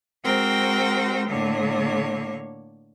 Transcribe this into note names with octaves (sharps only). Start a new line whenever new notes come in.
G#3 C4 F#4 A#4 C5 G5
A2 D3 A#3 C#5